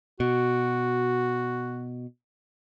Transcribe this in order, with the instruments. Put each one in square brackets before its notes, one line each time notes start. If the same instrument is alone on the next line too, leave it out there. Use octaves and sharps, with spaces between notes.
[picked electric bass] B2 [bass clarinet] F#4